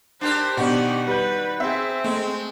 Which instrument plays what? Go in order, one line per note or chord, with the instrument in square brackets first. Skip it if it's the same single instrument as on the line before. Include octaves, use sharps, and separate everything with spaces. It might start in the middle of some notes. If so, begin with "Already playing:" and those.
[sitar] D4 G4 A#4 [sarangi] C5
[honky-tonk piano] B2 D4 [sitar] D#3 F#4 [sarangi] G4
[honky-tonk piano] G3 G6 [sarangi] B4
[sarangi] C4 [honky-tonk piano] G#4 E5
[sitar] G#3 [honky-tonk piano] A3